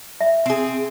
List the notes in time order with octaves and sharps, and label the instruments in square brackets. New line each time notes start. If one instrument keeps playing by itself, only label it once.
[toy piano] E5
[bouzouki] C4 G#4